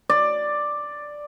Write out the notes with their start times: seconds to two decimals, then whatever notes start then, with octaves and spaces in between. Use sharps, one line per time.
0.09 D5